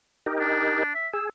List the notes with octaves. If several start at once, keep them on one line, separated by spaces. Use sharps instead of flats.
D#4 G4 A#4
D4
E5
G#4 E6